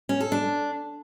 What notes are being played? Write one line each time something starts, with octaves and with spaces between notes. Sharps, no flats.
C#4
A4
D4